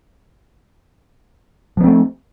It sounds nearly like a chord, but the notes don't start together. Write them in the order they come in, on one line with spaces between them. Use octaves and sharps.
F3 B3 C4 A3